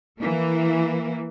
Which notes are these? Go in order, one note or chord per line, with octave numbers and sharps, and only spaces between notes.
E3 A#3